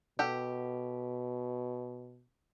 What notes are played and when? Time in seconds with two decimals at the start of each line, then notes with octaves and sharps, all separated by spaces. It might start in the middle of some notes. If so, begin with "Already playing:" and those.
0.19 B2 G4 A4 F#5